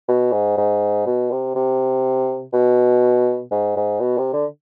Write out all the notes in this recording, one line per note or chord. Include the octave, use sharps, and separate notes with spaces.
B2
G#2
G#2
B2
C3
C3
B2
G#2
G#2
B2
C3
D3